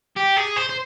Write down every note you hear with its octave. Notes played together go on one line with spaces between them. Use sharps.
G4
G#4
C5
C5